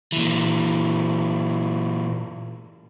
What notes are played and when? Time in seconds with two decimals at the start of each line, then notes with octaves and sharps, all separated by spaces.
0.12 A#2 E3